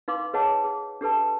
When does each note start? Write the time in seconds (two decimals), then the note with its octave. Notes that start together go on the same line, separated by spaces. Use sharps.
0.08 D#4 B4 F5 C6 D6
0.34 G#4 B4 C#5 D#5 F#5 A5
0.64 G#4
1.01 D4 G4 A4 B4 A5